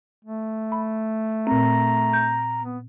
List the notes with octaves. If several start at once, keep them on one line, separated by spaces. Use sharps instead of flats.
A3
B5
A#2 C4 A#5
G6
B3